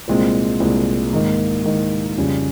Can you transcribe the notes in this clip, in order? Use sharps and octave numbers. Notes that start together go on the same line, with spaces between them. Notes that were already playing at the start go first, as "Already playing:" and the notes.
C2 A#2 G#3 C4
C2 A#2 G#3 C4
G#2 D#3 A#3 D#4
G#2 D#3 A#3 D#4
F2 C#3 G3 C#4